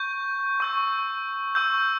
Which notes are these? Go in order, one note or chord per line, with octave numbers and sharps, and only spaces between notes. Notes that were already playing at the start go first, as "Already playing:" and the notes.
Already playing: C#6 G6
C#6 E6 G6
C#6 E6 G6